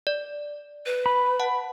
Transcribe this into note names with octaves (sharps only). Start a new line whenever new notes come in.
D5
B4
B5
F#5 A5